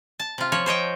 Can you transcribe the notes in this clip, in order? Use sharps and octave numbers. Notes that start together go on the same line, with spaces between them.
A5
C3 F4
F3 C#5
C5 C#5 D#5 G5